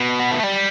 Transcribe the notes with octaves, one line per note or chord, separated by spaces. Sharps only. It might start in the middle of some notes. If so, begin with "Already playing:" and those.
Already playing: B2
B3
A3
G3